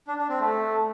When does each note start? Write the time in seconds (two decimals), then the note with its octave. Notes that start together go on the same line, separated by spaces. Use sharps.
0.07 D4
0.18 D4
0.29 C4
0.40 A3